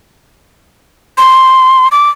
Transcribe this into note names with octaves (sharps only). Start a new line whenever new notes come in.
C6
D6